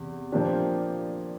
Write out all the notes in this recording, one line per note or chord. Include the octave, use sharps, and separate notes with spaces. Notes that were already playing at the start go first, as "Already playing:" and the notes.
Already playing: E2 C3
A#2 F3 A#3 D4 G4